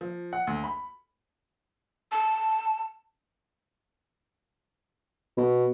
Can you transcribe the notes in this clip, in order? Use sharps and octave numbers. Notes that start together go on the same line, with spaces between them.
F3
F#5
D2
B5
A5
B2